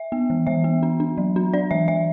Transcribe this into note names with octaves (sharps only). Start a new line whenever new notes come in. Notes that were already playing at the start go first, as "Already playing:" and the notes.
Already playing: E5
B3
E3
E3 E5
B3
D4
D4
F#3
D4
D4 D5
E3 E5
E3 E5